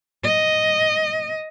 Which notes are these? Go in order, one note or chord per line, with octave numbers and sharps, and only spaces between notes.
D#5